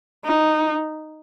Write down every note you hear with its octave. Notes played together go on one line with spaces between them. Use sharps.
D#4